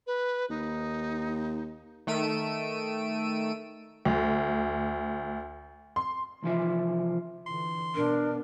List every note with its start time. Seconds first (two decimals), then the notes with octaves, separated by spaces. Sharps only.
0.07 B4
0.50 D#2 D#4
2.07 D#3 A3 E6 D7 D#7
4.05 D2
5.96 C6
6.43 C2 E3 F3 E5
7.46 D3 E3 C6
7.95 B2 B3 D4 A#4